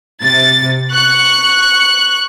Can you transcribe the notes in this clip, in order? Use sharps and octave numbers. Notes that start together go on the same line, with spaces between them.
C3 A6
C#6 F#6